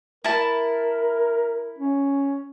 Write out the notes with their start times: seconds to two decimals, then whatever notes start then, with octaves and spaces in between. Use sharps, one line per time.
0.25 E4 A#4 A5
1.79 C#4